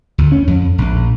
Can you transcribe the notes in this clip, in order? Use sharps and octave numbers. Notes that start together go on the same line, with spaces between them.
D2
C#4
F2
A#1